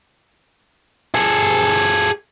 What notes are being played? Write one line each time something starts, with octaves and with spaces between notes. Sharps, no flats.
G#4 A4